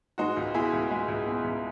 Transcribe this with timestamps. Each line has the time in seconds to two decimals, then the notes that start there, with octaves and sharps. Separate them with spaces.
0.18 G#3 D#4 F#4
0.37 C#2
0.54 B2 E4 G#4
0.73 C#2
0.91 G#3
1.08 C#2
1.27 B2
1.44 C#2